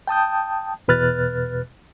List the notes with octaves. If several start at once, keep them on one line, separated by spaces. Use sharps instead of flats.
G5 A5 D#6 G6
E2 B2 B4 F6 F#6 A6